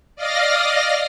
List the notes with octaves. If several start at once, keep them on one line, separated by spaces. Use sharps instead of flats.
D5 D#5 F5 F6 A#6